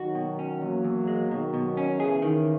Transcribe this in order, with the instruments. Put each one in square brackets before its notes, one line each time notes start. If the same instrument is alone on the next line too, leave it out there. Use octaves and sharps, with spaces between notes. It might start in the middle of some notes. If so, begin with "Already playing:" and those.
Already playing: [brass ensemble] D#3 F#3 [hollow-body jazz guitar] F#4
[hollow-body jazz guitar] B2
C#4
[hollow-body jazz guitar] E2 [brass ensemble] F#3 A#3
[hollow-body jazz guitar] E2
G#3
[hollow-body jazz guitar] B2 [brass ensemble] D#3 F#3
[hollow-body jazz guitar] B2
C#4
[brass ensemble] C#3 E3 [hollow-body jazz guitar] G#4
[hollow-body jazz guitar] D#3